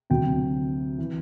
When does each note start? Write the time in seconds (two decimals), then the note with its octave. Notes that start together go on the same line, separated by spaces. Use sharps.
0.10 D2 C3 F#3 G5
0.98 E3